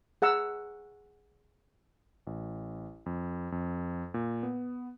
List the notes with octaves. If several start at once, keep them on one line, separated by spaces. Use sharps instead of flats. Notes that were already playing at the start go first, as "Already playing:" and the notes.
G#4 F#5 A#5 E6
A1
F2
F2
A#2
B3